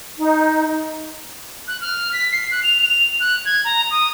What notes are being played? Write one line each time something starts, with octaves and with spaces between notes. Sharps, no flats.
D#4
F#6
F6
B6
C7
F#6
F7
F7
F#6
G#6
A#5
D#6